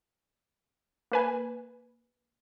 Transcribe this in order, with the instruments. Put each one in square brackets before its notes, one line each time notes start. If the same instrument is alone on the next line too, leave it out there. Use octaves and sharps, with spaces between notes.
[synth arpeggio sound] A#3 B4 G#5